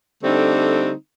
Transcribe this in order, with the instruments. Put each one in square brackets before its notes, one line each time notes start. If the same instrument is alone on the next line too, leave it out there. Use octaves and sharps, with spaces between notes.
[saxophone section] D3 G3 A3 C4 D#4